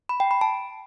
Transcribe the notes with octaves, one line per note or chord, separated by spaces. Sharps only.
B5
G5
B5
A5